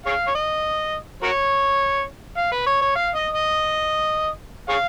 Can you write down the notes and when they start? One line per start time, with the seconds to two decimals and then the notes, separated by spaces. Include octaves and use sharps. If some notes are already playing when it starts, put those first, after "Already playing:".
0.06 G#4 C#5 F5
0.28 C#5
0.35 D#5
1.23 F#4 A#4 C#5
2.38 F5
2.52 B4
2.66 C#5
2.82 C#5
2.95 F5
3.15 D#5
3.35 D#5
4.69 G#4 C#5 F5